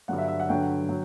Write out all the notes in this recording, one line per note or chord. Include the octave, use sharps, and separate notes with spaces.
G2 D3 F#3 F#5
E5
E5
F#5
G2 D3 F#3 G5
F#3